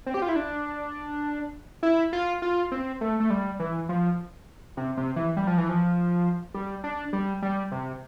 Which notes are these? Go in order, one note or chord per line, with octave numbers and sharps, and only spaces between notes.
C4
G4
F4
E4
D4
E4
F4
F4
C4
A3
A3
G3
E3
F3
C3
C3
E3
G3
F3
E3
F3
G3
D4
G3
G3
C3